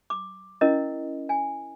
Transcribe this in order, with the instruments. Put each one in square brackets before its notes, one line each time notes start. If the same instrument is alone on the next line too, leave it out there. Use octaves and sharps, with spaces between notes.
[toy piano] D6
C#4 E4 A#4 D#5
G#5